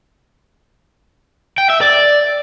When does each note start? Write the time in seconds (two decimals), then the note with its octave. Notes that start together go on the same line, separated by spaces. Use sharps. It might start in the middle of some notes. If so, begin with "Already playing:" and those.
1.58 G5
1.70 E5
1.81 D5